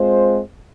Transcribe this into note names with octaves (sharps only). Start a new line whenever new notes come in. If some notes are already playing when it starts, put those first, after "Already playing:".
Already playing: G#3 C4 F4 C5